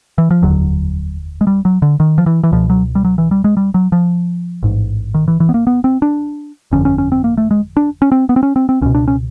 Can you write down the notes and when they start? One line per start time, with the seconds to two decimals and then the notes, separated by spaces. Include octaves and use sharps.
0.18 E3
0.31 F3
0.42 F1 D#2 D3 F#3
1.41 G#3
1.47 G3
1.65 F#3
1.82 D3
2.00 D#3
2.18 F3
2.26 E3
2.44 E3
2.52 C#2 B2 F3
2.70 F#3
2.95 G3
3.05 F#3
3.18 E3
3.31 G3
3.44 G#3
3.57 G3
3.74 F#3
3.92 F3
4.63 A1 G#2
5.14 D#3
5.28 E3
5.40 E3
5.49 B3
5.54 A#3
5.67 B3
5.84 C4
6.02 D4
6.71 G1 F2 D3 C#4
6.85 C#4
6.98 C#4
7.12 C4
7.24 A#3
7.38 A3
7.51 G#3
7.77 D4
8.02 C#4
8.12 C4
8.29 B3
8.36 C4
8.43 C#4
8.56 C4
8.69 C4
8.81 C#2 B2 C#4
8.95 D4
9.08 C#4